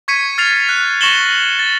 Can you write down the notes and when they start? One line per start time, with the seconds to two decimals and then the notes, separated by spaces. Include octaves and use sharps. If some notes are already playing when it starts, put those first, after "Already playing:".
0.08 C#6 G#6 B6 C#7 D#7
0.38 F6 A6 C7 F7
0.69 F#6
1.01 C#6 A#6 C#7 E7 F#7 G7
1.59 A6